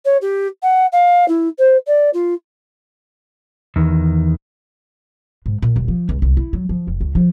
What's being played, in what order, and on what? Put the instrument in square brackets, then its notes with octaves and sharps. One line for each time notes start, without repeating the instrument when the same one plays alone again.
[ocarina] C#5
G4
F#5
F5
E4
C5
D5
F4
[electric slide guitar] E2 D#3
[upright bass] G#2
A#2
D#1
F3
C#2
C2
E4
F#3
F3
F1
C#2
F3